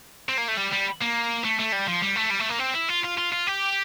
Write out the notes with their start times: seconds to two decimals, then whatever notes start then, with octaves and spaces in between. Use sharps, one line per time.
0.29 C4
0.38 A#3
0.48 A3
0.57 G3
0.72 G3
1.01 A#3
1.44 A3
1.59 A3
1.72 G3
1.87 F3
2.02 G3
2.16 A3
2.31 G3
2.40 A3
2.50 A#3
2.60 C4
2.75 E4
2.88 F4
3.03 F4
3.17 F4
3.32 F4
3.47 G4